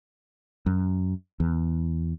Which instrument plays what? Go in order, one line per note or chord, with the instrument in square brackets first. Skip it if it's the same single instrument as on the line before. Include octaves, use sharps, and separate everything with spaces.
[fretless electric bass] F#2
E2